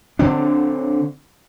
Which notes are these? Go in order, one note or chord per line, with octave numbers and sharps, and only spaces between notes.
D3 C4 D4